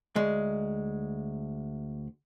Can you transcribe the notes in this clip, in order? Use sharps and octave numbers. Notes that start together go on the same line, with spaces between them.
D2 G#3